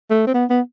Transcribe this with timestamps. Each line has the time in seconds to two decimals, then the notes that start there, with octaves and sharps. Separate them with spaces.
0.10 A3
0.27 C4
0.34 B3
0.50 B3